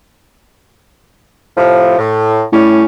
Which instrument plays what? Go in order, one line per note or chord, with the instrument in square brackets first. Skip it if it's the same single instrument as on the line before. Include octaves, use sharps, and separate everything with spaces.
[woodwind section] A2 C3 F3
A2
[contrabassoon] A2 [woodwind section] G3 C#4